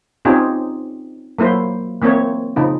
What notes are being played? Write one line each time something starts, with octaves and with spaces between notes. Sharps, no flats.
C4 C#4 D#4 F4 G4 G#4
F#3 A#3 E4 C5
E3 A#3 C4 C#5
C#3 F3 D#4